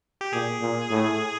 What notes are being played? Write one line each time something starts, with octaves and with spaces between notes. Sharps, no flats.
G4
A#2 G#4
A#2
A2